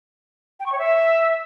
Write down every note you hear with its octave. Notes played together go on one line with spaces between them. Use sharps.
G5
C#6
C#5
E5